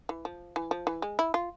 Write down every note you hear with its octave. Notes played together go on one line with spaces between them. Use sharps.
E3
F3
E3
F3
E3
G#3
E4
F4